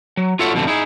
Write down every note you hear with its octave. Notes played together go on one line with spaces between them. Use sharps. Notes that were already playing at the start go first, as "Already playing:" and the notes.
F#3
F4 F#4 A4 C#5 E5 F#5
F2 G#2 B2 D3 A3 C4
D#4 E4 G#4